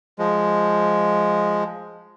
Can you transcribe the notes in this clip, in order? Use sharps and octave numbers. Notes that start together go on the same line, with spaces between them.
F3 G#3